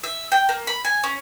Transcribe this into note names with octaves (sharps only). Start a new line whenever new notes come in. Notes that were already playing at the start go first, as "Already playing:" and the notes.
E5
G5
A#3
B5
G#5
C#4